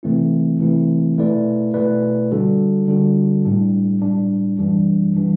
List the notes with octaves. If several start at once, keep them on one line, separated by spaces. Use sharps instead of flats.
C3 E3 A3 C4 E4
C3 E3 A3 C4 E4
B2 A3 E4 B4 D5
B2 A3 E4 B4 D5
D3 G3 D4 F#4 A4
D3 G3 D4 F#4 A4
A2 G3 D4
A2 G3 D4
F#2 E3 G3 D4
E3 G3 D4